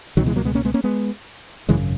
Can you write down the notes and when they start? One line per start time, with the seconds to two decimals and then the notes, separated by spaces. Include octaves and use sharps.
0.17 C#2 B2 D#3 F#3
0.26 E3 G#3
0.36 F#3 A#3
0.45 G#3 B3
0.55 A#3 C#4
0.65 G#3 B3
0.74 A#3 C#4
0.84 G#3 B3
1.69 G#1 F#2 C#3 E3 G#3